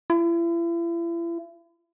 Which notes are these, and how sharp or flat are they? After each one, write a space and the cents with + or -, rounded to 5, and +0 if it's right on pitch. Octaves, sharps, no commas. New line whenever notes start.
E4 +40